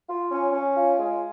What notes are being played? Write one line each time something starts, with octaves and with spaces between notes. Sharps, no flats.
F4
C#4
C#4
F4
G#3